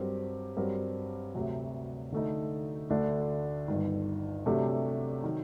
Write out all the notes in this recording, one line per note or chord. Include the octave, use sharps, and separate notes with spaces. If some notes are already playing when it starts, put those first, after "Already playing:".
Already playing: G2 F#3 C4 G4 A#4
G2 F#3 C4 G4 A#4
D2 C3 F#3
D3 A3 D#4
D2 D3 A3 D4 A4
G1 G2 D#3
C3 F#3 A3 D4 G4
D#3 F#3